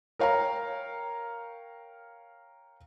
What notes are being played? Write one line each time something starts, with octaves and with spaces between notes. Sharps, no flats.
A#4 C#5 F5 G5 A#5